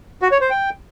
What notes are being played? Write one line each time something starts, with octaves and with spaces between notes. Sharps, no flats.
F#4
C#5
C5
G5